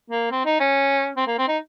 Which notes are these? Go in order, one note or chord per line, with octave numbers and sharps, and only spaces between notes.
A#3
C4
D#4
C#4
C4
A#3
C4
D#4